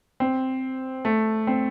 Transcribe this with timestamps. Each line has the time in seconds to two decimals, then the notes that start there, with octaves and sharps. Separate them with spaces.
0.20 C4
1.05 A3
1.47 C4